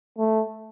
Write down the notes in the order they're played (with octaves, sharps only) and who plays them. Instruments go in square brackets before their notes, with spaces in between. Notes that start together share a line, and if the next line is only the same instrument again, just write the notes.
[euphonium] A3